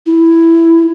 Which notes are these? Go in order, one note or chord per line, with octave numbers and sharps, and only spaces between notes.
E4